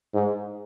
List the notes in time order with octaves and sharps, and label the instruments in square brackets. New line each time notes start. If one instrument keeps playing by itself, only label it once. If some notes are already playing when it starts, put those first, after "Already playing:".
[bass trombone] G#2